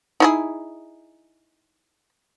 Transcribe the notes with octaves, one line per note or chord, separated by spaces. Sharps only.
D#4 E4 G#4